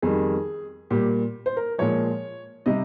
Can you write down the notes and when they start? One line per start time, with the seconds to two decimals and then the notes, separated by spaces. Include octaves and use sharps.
0.02 F2 D#3 G3 G#4
0.90 A#2 G3 G4
1.46 C5
1.57 A#4
1.78 A#2 F3 G#3 C#5
2.66 C3 G3 D#5